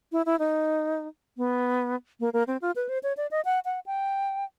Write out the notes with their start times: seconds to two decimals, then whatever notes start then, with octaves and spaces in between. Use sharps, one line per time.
0.12 E4
0.26 E4
0.39 D#4
1.37 B3
2.20 A#3
2.33 A#3
2.47 C4
2.62 F4
2.76 B4
2.89 C5
3.03 C#5
3.17 D5
3.31 D#5
3.45 F#5
3.65 F#5
3.86 G5